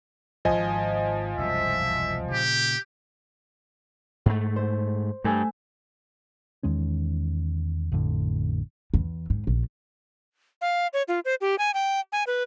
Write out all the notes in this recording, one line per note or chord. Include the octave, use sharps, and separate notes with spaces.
D#1 G#1 F3 D#5 G#5
E1 C2 F#2 E5
A#2 C#3 G4
G#2 A3
C5
G2 A3 G#5 E6
E2 D#3 G#3 C#4
A1 F2 A2 D3
E2
G#2
A#1
F5
C#5
F4
C5
G4
G#5
G5
G#5
B4